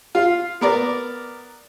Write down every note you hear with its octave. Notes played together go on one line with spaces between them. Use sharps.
F4
B3 A#4 D5